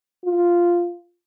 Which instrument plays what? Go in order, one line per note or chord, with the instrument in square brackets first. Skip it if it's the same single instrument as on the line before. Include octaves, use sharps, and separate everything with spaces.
[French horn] F4